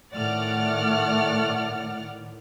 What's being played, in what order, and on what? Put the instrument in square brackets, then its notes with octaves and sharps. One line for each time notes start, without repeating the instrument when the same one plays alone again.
[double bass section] A2 D#3 [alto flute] A3 [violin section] D5 F#5 F6